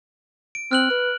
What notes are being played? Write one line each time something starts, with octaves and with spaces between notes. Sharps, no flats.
D7
C4 F6 F#6 F#7
B4